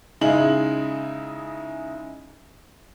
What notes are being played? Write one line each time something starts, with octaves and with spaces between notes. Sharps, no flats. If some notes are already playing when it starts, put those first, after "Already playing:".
C#3 G#3 D#4 E4 F#7